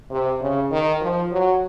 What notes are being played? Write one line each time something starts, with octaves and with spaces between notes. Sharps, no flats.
C3
C#3
D#3
F3
F#3